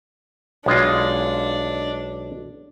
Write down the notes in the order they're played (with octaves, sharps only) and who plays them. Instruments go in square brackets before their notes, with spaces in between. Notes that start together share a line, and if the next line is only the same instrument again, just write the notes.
[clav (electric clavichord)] B1 G#3 F4 [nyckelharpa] D4